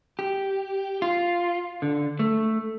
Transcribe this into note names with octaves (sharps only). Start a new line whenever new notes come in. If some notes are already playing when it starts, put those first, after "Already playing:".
G4
F4
D3
A3